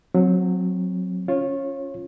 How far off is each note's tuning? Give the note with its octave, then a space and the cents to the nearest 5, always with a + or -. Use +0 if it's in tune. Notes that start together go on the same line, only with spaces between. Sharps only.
F#3 -20 C4 +0
C#4 +0 F4 +0 C#5 -25